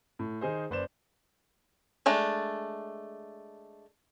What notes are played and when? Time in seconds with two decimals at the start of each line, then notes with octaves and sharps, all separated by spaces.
0.19 A2
0.41 D#3 D#4 G#4 C5
0.70 F#1 B4 C5 D5 E7
2.06 G#3 A3 D4